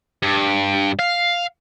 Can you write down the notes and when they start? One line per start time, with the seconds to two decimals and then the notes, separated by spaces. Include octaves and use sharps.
0.22 G2
0.99 F5